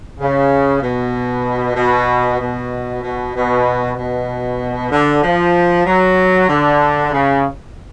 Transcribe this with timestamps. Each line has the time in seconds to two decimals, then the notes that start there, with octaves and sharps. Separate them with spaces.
0.19 C#3
0.81 B2
1.76 B2
2.39 B2
3.03 B2
3.34 B2
3.96 B2
4.91 D3
5.23 F3
5.86 F#3
6.49 D3
7.12 C#3